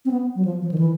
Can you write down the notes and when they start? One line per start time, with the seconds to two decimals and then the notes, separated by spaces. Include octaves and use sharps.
0.05 C4
0.11 B3
0.36 F#3
0.45 F3
0.62 F3
0.71 D#3
0.78 E3